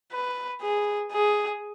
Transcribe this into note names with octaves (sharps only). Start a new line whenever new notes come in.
B4
G#4
G#4